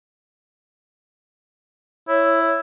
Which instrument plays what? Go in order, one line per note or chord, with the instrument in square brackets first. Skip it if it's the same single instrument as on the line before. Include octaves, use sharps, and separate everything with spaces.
[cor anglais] E4 [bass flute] C#5